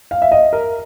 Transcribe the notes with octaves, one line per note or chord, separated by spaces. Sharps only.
F5
E5
D#5
A#4